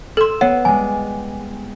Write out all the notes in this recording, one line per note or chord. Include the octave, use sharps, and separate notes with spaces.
A4 C6 E6
B3 C#5 F#5
G3 G#3 G#5